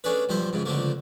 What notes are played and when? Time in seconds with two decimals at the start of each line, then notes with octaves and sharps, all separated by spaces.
0.04 A3 C#4 D4 G#4 B4
0.29 B1 G2 F3 E4 C5
0.53 F2 G#2 C#3
0.65 C#2 D3 F3 A3 A#3